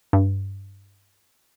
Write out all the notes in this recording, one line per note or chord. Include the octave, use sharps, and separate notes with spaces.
G2